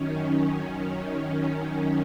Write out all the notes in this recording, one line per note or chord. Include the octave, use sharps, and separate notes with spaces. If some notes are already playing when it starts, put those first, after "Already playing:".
Already playing: F#2 D#3 C#4